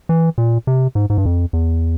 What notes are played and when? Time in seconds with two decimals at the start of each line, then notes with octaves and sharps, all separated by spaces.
0.09 E3
0.38 A#2
0.67 C3
0.95 G#2
1.10 G#2
1.18 G2
1.25 F2
1.53 E2